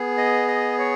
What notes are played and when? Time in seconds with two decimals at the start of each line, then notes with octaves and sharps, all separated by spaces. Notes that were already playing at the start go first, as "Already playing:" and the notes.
Already playing: B3 G#4
0.18 D#5
0.48 D#5
0.79 C#5